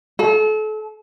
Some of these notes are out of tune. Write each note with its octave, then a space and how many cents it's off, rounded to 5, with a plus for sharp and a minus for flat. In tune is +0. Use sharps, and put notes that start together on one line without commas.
A4 -35